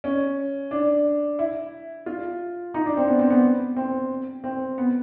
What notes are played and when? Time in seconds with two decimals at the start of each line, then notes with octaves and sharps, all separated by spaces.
0.04 C#4
0.71 D4
1.39 E4
2.06 F4
2.74 D#4
2.86 D4
2.97 C4
3.08 B3
3.19 C4
3.30 B3
3.76 C4
4.44 C4
4.78 B3